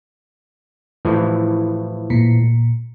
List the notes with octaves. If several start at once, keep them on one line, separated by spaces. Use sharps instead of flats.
A2 E3 F3
A#2